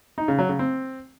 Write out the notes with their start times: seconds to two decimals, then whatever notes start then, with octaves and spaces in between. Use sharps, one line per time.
0.18 D#4
0.28 C#3
0.38 F#3
0.49 C#3
0.59 C4